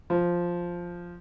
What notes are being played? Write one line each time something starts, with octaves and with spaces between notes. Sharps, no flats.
F3